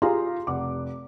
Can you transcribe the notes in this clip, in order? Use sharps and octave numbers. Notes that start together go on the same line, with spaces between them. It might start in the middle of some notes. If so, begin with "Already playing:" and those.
F4 G4 G#4 F5 A#5 C6
F1 F#5 D6